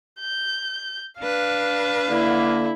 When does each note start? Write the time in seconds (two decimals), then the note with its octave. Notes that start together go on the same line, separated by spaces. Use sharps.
0.20 G6
1.20 D4 B4 F5
2.09 D3 A#3 E4